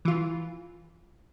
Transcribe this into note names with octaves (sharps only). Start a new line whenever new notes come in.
E3 F4